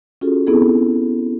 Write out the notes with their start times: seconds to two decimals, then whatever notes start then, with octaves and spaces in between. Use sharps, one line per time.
0.21 C#4 F4 F#4 G#4 A4
0.47 B3 C4 E4 G#4 A4